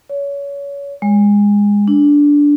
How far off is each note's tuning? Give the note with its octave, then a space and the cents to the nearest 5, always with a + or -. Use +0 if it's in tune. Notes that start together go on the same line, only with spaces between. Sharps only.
C#5 +25
G#3 -20
D4 -10